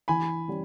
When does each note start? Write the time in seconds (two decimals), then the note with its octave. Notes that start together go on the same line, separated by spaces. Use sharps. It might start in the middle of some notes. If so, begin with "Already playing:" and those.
0.08 E3 G#5 B5
0.48 G3 C#4